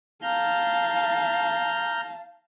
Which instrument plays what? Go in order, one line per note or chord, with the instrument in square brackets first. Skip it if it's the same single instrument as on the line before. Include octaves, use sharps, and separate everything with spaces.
[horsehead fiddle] F5 A5 [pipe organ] A#5 F6 G6